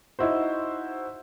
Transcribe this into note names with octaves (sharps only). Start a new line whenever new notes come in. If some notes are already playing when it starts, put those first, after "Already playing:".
D#4 E4 F#4 C5